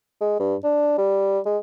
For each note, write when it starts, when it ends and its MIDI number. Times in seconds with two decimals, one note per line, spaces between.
0.21 0.39 56
0.39 0.55 43
0.64 0.98 62
0.98 1.39 55
1.45 1.58 56